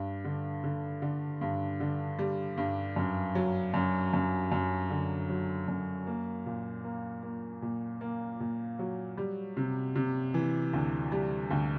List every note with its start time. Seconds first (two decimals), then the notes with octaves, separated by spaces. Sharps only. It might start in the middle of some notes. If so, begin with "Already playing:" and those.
Already playing: G2
0.24 D3
0.64 D3
1.02 D3
1.41 G2
1.80 D3
2.19 G3
2.57 G2
2.96 F#2
3.35 F#3
3.74 F#2
4.14 F#2
4.52 F#2
4.90 D3
5.29 F#3
5.68 F#2
6.07 A#3
6.46 A#2
6.84 A#3
7.23 A#3
7.62 A#2
8.01 A#3
8.40 A#2
8.79 F#3
9.18 G3
9.57 C3
9.95 C3
10.34 E3
10.73 D2
11.12 G3
11.51 D2